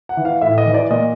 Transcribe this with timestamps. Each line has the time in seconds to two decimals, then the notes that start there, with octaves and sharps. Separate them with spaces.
0.09 F#5
0.17 E3
0.25 F5
0.41 A2 E5
0.58 D#5
0.66 E3
0.74 D5
0.90 A#2 D#5